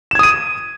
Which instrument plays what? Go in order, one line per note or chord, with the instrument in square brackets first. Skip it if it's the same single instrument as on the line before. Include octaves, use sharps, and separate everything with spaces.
[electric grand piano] E7
G#6
D#6
D#7